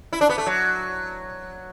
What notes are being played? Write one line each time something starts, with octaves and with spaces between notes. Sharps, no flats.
E4
D4
B3
A3
F#3